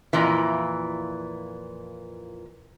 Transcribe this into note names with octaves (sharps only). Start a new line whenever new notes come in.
F2 A#2 E3